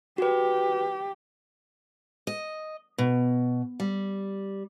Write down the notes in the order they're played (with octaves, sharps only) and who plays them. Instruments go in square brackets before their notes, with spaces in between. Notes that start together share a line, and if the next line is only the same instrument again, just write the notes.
[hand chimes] F#4 B4 [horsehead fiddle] G4
[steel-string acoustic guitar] D#5
B2
G3